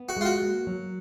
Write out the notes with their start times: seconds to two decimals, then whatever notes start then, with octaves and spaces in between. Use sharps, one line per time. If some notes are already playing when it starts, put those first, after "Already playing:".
Already playing: B3
0.09 F#4
0.17 G#3 F4
0.25 F#4
0.42 A#3
0.67 F#3